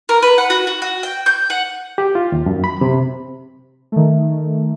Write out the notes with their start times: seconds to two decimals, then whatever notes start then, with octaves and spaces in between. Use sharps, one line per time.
0.09 A#4
0.23 B4
0.38 F#5
0.50 F#4
0.67 F#4
0.82 F#4
1.03 G5
1.26 G6
1.50 F#5
1.98 G4
2.15 F4
2.32 D#2
2.46 F#2
2.64 B5
2.81 C3
3.92 D#3 A3